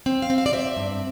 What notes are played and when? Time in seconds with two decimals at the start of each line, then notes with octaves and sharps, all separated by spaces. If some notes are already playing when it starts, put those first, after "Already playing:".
0.06 C4
0.22 F5
0.30 C4
0.38 F5
0.46 D5
0.53 C4 E5
0.77 G2